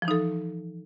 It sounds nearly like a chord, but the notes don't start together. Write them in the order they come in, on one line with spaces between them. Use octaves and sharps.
F3 E3 D#4 A4